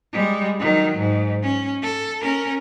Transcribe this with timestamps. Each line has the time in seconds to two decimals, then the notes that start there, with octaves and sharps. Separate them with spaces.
0.12 G3 G#3
0.60 D#3 F#3
0.98 G#2
1.43 C#4
1.83 A4
2.21 C#4 A#4